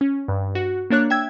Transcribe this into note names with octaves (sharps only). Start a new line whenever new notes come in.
C#4
G2
F#4
A#3 D4 C#5 F#6
E5 G5 E6 G#6